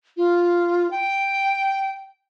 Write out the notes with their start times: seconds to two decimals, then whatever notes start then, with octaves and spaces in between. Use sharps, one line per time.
0.17 F4
0.91 G5